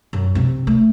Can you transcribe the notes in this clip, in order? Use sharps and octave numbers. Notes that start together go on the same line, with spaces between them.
F#2
C3 C4
A3